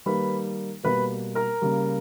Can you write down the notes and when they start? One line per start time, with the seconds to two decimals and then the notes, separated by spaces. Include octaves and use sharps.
0.06 D#3 G3 A#3 B4 B5
0.83 B2 G3 A#3 B4 B5
1.35 A#4 A#5
1.62 C#3 G3 A#3